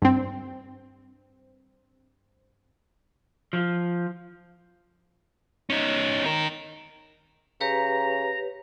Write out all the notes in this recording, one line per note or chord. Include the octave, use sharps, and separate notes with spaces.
G2 C4
F3
C#4 D#4
D#4 A#4
C#3 G4 B4 C#5 A#5